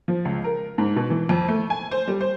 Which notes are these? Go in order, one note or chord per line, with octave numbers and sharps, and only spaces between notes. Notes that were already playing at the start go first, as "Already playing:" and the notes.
F3
C#2
A#4
G#2
B2
E3
F2
A3
G#5
C5
G3
C5